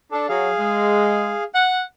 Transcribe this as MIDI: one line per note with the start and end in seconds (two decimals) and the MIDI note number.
0.12 0.27 62
0.12 0.26 69
0.29 0.49 54
0.29 1.44 68
0.29 1.44 77
0.59 1.34 56
1.55 1.82 78